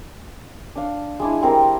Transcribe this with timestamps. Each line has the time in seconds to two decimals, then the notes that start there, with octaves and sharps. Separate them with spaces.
0.76 D4 F5
1.20 G#3 D4 E4
1.42 G3 C4 A#4